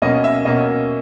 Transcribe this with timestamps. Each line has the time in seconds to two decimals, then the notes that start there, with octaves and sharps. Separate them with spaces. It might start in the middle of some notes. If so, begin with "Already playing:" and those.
0.02 B2 A#3 C#4 D#5
0.24 E5
0.45 B2 A#3 C#4 D#5